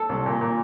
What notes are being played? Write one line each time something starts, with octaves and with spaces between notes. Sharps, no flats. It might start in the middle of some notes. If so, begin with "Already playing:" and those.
Already playing: A4
C2
A#2
A#2